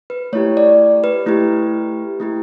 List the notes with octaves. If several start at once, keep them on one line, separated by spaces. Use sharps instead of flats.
B4
A3 E4 G4 C#5
D5
B4
A3 E4 G4
A3 E4 G4